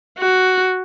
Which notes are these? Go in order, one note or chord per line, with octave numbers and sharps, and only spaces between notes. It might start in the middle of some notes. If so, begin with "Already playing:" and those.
F#4